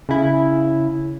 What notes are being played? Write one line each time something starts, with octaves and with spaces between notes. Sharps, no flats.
C#3 E4